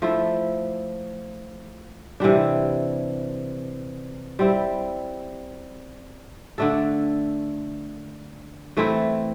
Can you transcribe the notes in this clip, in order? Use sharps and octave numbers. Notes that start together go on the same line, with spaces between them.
F3 A3 E4
C3 E3 G3 D4
G3 C4 E4
D3 A3 D4 A4
E3 A3 C4 E4